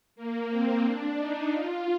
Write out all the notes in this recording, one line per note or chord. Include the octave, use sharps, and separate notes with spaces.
A#3
C4
D4
D#4
F4